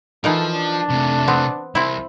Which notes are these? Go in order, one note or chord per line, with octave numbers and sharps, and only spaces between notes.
E3 F3 D#4 A4 A#4
D4
C3 A3
B3 C4
C2 C4 E4